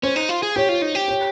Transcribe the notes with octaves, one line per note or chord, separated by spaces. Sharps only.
C#4 C5
D#4
F4
G#4
G4 C#5
F4
D#4
G4
C#5